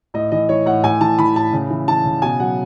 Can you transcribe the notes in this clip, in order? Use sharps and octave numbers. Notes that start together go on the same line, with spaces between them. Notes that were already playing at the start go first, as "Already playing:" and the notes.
A2 D#5
E3 D#5
E3 C#5
A2 F#5
A2 G#5
E3 A5
E3 B5
A2 A5
C#3
E3
E3 A5
C#3
B2 G#5
F#3 F#5